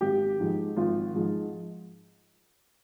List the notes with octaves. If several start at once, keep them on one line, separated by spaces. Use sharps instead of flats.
G#1 G4
G#2 F3 G#3
G#1 F4
G#2 F3 G#3